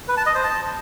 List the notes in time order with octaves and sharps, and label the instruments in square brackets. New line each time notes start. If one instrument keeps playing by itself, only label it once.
[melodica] B4
A5
D#5
C5
A5